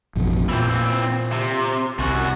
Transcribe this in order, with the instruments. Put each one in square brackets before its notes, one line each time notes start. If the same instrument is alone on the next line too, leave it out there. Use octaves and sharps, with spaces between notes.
[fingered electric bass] A1 F2 B2
[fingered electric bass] A#2 [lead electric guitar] E3 C4
[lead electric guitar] C3
[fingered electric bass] C2 [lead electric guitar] F#2 F#4